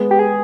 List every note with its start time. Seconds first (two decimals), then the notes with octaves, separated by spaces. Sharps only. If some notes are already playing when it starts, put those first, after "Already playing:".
Already playing: G#3 B3
0.11 G4
0.19 G#4